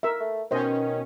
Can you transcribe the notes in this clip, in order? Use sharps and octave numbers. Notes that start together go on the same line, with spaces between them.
A#4 E5
A3
B2 D#3 C#4 C5 D#5